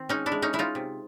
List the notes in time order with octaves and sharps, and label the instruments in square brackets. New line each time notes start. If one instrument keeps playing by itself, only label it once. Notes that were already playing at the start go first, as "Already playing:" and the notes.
Already playing: [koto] D#3 C4
G#3 C#4 D#4
D4 E4
G#3
C#4 D#4
G#3 E4
D#4 F4
C3